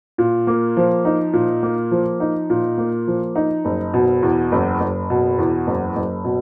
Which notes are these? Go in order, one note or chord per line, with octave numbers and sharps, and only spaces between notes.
A#2
A#3
F3
D#4
A#2
A#3
F3
D#4
A#2
A#3
F3
D#4
F#1
B2
E2
F#1
F#1
B2
E2
F#1
F#1
B2